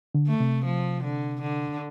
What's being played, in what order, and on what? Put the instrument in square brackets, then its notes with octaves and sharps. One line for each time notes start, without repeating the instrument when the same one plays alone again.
[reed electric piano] D3
[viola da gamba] A3
[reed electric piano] C3
[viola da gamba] F3
D3
D3